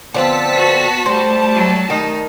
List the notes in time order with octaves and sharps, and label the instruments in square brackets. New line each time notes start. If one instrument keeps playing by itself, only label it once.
[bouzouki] D3 F3 C4 [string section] B3 A5 B6
[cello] F#4
[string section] G3 A3 A5 [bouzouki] C5
[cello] F#3
[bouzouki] D#3 [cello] D#4